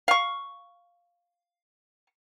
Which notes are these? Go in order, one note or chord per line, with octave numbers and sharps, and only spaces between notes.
F5 C#6